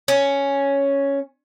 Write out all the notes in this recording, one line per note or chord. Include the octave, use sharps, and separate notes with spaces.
C#4